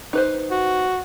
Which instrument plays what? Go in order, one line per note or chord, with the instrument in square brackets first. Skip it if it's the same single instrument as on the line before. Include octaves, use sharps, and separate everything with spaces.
[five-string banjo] D#4 B4 C5
[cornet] F#4